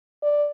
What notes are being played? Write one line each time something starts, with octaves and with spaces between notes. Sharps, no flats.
D5